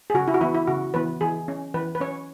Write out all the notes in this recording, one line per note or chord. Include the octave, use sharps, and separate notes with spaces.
G#4
C#3 F#4
E4
F#4
E3 B3 E4
E4
C#3 F#4
E3 B3 B4
E3 G#4
C#4
E3 B4
B4
C#4 C#5